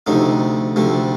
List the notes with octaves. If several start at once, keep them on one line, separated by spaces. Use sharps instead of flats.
D2 C3 F3 A3 D#4
D2 C3 F3 A3